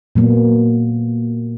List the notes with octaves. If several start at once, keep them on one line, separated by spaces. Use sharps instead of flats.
A#2 F#3 A#3 B3